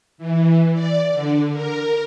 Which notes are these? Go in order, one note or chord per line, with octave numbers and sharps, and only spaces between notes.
E3
D5
D3
A#4